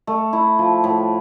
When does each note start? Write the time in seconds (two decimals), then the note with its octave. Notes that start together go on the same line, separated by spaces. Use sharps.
0.07 A3
0.33 E4
0.59 F3
0.84 A2